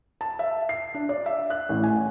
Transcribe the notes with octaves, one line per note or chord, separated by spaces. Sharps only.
A5
E5
C7
D4
D5
E5
F#6
A1
G#5